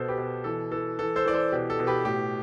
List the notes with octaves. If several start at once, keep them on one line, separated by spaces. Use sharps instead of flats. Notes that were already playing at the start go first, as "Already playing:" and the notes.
Already playing: B2 A4 C5
G4 B4
B2
E3 A4
E3 A4
E3 A4
A4 C5
E3 D5
A4 C5
B2 G4
A4
B2
G4 B4
A2 G4